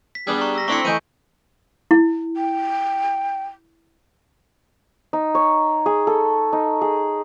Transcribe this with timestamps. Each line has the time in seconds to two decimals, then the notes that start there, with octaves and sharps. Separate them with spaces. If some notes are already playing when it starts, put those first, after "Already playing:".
0.15 B6
0.27 G3 B3 D4 G#4
0.41 A#5 C#6
0.56 E6 A#6 B6
0.68 A3 C4 D4 E4 C#6 B6 C#7
0.85 E3 A3 D#5 G#5 G6 D#7
1.91 E4
2.37 G5
5.13 D#4
5.35 C#5
5.86 G#4
6.07 A4
6.53 D#4
6.81 G#4